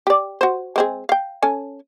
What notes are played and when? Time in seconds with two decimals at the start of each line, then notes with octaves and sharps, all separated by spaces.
0.07 G4 D5
0.41 F#4 C5
0.76 G#3 C4 G#4
1.09 F5 G5
1.42 C#4 A4 G#5